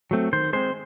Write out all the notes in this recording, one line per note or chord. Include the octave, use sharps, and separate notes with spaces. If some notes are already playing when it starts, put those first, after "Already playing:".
F#3 A3 C4
D#3 C5
G#3 C4 C5